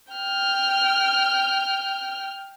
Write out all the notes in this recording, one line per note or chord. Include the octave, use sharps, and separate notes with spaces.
G5 F6